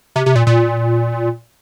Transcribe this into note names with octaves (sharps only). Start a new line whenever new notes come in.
C3
C3
A#2
A#2